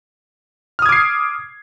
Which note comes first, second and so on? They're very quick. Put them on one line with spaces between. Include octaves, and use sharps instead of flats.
F6 D#6 G#6 D6 C7